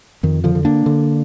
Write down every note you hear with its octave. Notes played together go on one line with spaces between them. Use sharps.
F2 D#3
D3 F3
D3
A#3 D4
D3